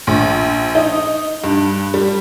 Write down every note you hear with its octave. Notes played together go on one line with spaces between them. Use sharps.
A#1
D#4
G2
G3